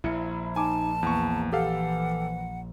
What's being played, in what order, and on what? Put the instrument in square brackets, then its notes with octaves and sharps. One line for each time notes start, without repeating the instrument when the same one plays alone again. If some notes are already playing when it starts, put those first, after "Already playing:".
[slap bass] A#1 [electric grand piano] E4 C#7
[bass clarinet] D#4 [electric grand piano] G#5 D6 [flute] A5
[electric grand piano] E2 C#6 [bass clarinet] A#3
[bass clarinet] E3 [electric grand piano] G4 A4 F5 [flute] F#5